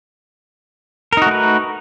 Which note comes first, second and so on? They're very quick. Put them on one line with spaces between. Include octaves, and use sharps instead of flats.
A#4 D#4 F#4 A3 B4